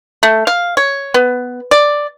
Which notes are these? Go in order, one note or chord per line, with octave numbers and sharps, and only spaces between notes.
A3
F5
C#5
B3
D5